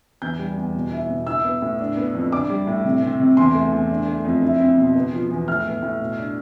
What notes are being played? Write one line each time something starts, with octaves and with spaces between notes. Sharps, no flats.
E2 G6
G3
E2
B2
E4
B2
E4 E6
B3
A2
D4
B3
F2
D4 D6
G3
A2
C3
C4
C3
E2 C6
A3
E2
D4
A3
F2
E4
C4
B2
B3
F3
E2
A2 F6
B3
A2
B2
D4